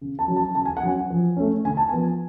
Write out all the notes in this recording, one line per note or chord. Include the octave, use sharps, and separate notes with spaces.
C#3
A5
F#3 C#4
A5
C#3 A5
G#5
F#5
F#3 C#4 G#5
F3
A3 C#4
D3 G#5
A5
F3 B3 G#5